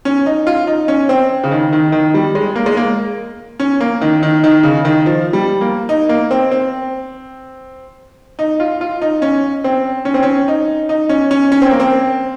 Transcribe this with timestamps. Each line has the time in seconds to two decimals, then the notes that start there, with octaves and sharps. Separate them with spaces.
0.05 C#4
0.26 D#4
0.47 F4
0.67 D#4
0.88 C#4
1.09 C4
1.44 C#3
1.51 D#3
1.73 D#3
1.92 D#3
2.14 G3
2.35 G#3
2.56 A#3
2.66 G#3
2.77 A#3
3.60 C#4
3.81 A#3
4.01 D#3
4.23 D#3
4.44 D#3
4.63 C#3
4.85 D#3
5.06 F3
5.33 G3
5.61 A#3
5.89 D#4
6.09 A#3
6.31 C4
6.51 C4
8.39 D#4
8.60 F4
8.81 F4
9.01 D#4
9.22 C#4
9.64 C4
10.05 C#4
10.14 C4
10.23 C#4
10.48 D#4
10.89 D#4
11.09 C#4
11.31 C#4
11.52 C#4
11.62 C4
11.71 A#3
11.80 C4